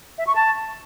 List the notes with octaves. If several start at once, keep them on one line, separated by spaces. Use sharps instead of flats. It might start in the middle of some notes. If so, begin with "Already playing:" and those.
E5
C#6
A5